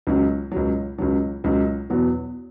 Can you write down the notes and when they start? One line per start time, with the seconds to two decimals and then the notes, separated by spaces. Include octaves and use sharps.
0.07 C#2 C#3 F#3
0.52 C#2 C#3 F#3
0.98 C#2 C#3 F#3
1.44 C#2 C#3 F#3
1.90 E2 B2 F#3 B3